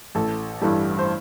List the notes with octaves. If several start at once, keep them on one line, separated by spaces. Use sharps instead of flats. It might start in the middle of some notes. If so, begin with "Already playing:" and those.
A1 A4
G2 E3 G3 A4
C5